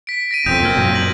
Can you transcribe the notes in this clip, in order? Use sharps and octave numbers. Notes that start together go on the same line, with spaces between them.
B6 D7
A#6 D7 D#7
E1 F2 C4 D#6 G6 B6
C3 A#3 F6 G#6 D7
F#2 A#2 F#3
A#6 F#7